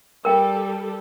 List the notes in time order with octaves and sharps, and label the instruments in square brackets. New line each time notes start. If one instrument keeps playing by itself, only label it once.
[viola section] G3 A4 [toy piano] A#4 G5